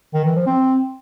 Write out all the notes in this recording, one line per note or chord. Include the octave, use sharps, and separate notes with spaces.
D#3
E3
F3
C4